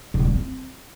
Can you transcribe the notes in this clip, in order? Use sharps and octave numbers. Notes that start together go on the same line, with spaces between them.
A2
A#2
F3
C4